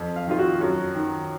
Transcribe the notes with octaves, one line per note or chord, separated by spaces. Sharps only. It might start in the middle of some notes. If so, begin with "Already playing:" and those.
Already playing: F2
F5
D#3 F4
F#4
F#2 F#4
D#3